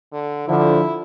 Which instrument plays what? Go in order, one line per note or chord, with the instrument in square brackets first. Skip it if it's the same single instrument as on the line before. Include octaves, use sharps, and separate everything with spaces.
[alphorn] D3
[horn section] D3 F3 [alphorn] E4